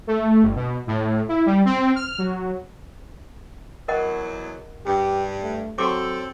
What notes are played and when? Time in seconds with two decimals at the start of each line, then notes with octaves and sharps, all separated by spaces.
0.07 A3
0.43 G1
0.56 B2
0.87 A2
1.29 E4
1.46 G3
1.65 C4
1.95 F6
2.18 F#3
3.88 E2 F#3 A#4 D#5 F#5
4.86 G2 G4
5.42 A3
5.78 F#3 C4 F#4 G4 A4 D6